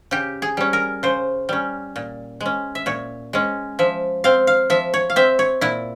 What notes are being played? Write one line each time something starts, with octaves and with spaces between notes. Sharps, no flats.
C#3 G4
G#4
G3 C#4
A#4
C#3 C5
G3 C#4
A#2
G#3
C#4
E5
A#2 C#5
G#3 C#4
F3 E5
C4 F5
F5
F3 E5
C#5
F5
C4 E5
C#5
A#2 E4